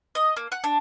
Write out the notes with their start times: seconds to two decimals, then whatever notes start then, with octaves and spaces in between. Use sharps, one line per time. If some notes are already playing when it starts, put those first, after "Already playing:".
0.15 D#5
0.37 A#3
0.52 F#5
0.64 D4